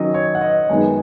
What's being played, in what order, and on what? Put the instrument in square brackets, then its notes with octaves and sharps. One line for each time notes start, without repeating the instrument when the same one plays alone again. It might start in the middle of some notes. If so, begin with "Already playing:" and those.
Already playing: [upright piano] D#3 F#3 C#4 [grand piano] D#5
[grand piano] C#5
F#5
D#5
[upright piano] F#2 D#3 G#3 B3 D#4 [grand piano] G#5